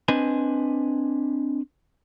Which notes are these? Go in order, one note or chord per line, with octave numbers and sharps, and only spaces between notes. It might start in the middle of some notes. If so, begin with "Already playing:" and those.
C4 D4 B4 D#5 G#5